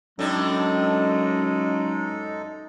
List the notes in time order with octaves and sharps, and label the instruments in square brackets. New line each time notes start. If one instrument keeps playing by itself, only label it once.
[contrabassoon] F#2 [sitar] A2 D4 [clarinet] G#3 [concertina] D#4 A4